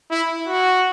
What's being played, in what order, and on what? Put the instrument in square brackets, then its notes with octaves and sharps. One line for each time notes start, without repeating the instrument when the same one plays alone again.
[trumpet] E4
F#4